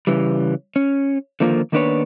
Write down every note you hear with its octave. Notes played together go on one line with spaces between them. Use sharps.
C#3 E3 G3
C#4
D3 D#3 F3 A#3 F4
D#3 A#3 B3 D4 B4 C#5